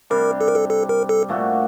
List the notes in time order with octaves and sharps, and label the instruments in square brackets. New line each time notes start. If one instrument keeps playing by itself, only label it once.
[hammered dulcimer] C3 G3 D4 [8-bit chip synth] A#4
[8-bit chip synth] A4
A#4
A4
A4
A#4
A4
[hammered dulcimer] A#2 A3 D4 F#4